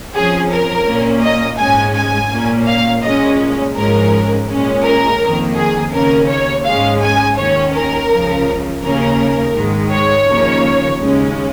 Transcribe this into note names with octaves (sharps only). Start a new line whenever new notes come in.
F2 F3 C#4 G#4
A#4
A#2 A#3 C#4
D#5
G#2 G#3 C#4 G#5
G#5
A#2 A#3 C#4
F5
A#2 G#3 C#4 D#5
G#2 F3 G#3 C#4 A#4
A#2 G#3 C#4
A#4
F2 D#3 A#3
G#4
D#2 C#3 A#3 C#4 A#4
C#5
G#2 G#3 C#4 F5
G#5
D#2 D#3 C#4 C#5
A#4
C#2 C#3 F3
D#2 C#3 A#3 C#4 A#4
G#2 D#3 G#3
C#5
D#2 C#3 F3 A#3
D#2 C#3 G#3 C#4